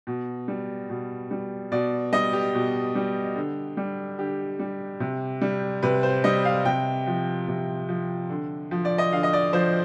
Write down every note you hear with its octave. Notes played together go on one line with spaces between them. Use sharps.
B2
G3
B2
G3
B2 D5
G3 D#5
G4
B2
G3
D3
G3
D3 G4
G3
C3
G3
C3 B4
C5
G3 D#5
F5
C3 G5
F3
C3
F3
D3
F3
D5
D#5
D3 F5
D#5
D5
F3 C5